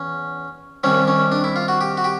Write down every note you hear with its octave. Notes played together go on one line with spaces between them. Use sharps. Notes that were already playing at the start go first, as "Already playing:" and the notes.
Already playing: E2 C#4
C2 C3 D#3 G3 C#4
C#4
D4
E4
F4
F#4
G4
F#4
G4